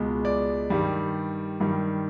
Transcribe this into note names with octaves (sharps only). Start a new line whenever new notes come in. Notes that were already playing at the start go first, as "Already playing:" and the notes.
Already playing: C#2 B2 G#3
D5
G2 D#3 G3
G2 D#3 G3